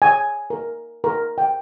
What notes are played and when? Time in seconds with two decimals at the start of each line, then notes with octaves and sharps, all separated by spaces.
0.02 G#5
0.50 A#4
1.04 A#4
1.38 G5